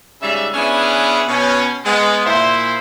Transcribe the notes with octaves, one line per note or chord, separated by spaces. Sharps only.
G#2 C#3 G3 E5
B3 C#4 D4 E4 G#4 B4
B2 C#4
G#3 B3
A#2 E4 C5